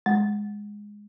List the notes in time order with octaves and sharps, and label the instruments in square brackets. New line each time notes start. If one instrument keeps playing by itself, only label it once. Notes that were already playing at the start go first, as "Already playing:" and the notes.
[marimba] G#3